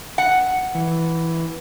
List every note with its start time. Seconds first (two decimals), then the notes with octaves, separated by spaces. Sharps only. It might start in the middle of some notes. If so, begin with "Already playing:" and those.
0.18 F#5
0.75 E3